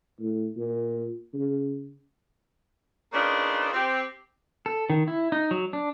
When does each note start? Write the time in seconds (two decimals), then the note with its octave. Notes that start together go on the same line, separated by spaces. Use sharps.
0.19 A2
0.57 A#2
1.34 C#3
3.13 C#3 A#3 D4 D#4 F4 B4
3.73 C4 G4
4.66 A4
4.90 D#3
5.08 E4
5.32 D#4
5.51 F#3
5.73 D4